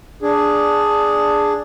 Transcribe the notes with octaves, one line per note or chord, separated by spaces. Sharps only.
D4 G#4